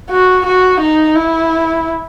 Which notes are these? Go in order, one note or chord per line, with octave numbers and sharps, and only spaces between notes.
F#4
F#4
D#4
E4